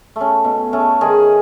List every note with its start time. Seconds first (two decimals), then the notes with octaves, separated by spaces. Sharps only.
0.16 A3 C#4
0.44 B2
0.73 A3 C#4
1.01 D#3 G#4